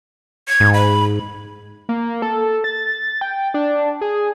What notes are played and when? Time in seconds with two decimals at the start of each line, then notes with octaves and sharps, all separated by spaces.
0.48 G#6
0.60 G#2
0.74 B5
1.89 A#3
2.22 A4
2.64 A6
3.21 G5
3.54 D4
4.01 G#4